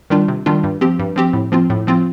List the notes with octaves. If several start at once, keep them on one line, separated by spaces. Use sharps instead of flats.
D#3 G3 D4 F4
C3
D#3 G3 D4 F4
G2
F3 C4 G4
G2
F3 C4 G4
A2
F3 C4 F4
A2
F3 C4 F4